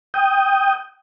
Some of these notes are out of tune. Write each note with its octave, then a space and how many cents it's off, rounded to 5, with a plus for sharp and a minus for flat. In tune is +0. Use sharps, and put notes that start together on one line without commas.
G5 +0 D#6 +0